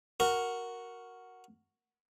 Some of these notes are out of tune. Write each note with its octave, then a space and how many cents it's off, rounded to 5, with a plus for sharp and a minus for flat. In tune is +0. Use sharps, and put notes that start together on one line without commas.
F#4 +0 A#4 +0